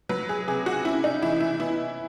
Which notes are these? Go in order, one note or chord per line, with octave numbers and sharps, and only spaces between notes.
F#3 B4
G#4
C3 G#4
F#4
C#4 E4
D#4
E3 E4
E4
B3 E4